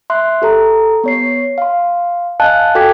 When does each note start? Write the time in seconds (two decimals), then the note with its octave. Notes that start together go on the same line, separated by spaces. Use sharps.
0.10 E5 C6 F#6
0.42 G4 A4 A#5
1.04 B3 C#5 C7
1.58 F5 C6
2.40 D#5 F5 G#5 A5 F#6
2.75 F#4 A4 G5 D6 G#6 B6